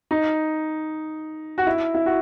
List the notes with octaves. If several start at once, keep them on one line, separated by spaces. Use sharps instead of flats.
D#4
F#4
E4
E4
F#4